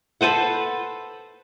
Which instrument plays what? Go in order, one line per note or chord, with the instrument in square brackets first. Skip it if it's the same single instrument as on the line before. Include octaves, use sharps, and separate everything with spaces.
[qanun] A4 B4 C5 F#5